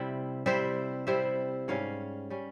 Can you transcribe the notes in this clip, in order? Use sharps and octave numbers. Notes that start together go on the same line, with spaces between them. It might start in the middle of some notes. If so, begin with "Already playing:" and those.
Already playing: C3 G3 C4 E4
C3 G3 C4 E4 C5 E5
C3 G3 C4 E4 C5 E5
G#2 G3 C#4 C#5 F5
G3 C#4